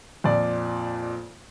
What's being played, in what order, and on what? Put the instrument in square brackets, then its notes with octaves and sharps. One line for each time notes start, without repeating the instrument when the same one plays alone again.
[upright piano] F2 A#2 D5